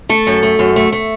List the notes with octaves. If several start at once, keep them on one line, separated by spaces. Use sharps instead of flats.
A3 A4
F#2
A3
F#2
A3
A3